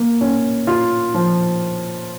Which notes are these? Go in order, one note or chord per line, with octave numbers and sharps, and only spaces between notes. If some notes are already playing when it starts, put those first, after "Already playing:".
Already playing: A#3
C#4
F4
F3